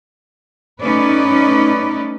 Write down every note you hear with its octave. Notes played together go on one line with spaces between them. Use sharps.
A3 C#4 D#4 B4 D5